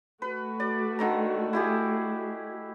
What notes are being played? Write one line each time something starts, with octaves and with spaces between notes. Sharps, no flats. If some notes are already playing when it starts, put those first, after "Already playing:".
A3 F#4 B4
D5
D3 D#3 A#5
E4 G4 G#4